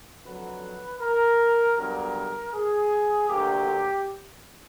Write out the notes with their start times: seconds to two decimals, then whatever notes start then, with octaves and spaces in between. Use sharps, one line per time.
0.25 F2 D3 F#3 B4
1.00 A#4
1.77 G2 D3 F#3 B3 A#4
2.53 G#4
3.29 D2 D3 F#3 A#3 G4